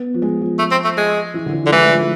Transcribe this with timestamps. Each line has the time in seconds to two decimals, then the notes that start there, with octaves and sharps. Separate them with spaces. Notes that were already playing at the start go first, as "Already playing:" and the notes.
Already playing: B3
0.14 F3
0.22 G#3
0.41 F3
0.59 A3
0.71 C4
0.85 A3
0.98 G#3
1.34 E3
1.46 D3
1.53 E3
1.62 D3 F3
1.71 E3 G#3
1.81 A3
1.91 F3
2.00 A3